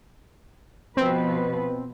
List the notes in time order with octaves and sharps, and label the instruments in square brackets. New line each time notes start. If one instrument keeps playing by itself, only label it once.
[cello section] B2 F3 B4 [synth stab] C4